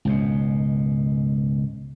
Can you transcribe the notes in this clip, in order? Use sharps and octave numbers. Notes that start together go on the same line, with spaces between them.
C#2 G#2 B2